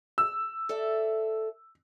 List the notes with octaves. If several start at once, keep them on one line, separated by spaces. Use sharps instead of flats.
E6
A4 D5 E5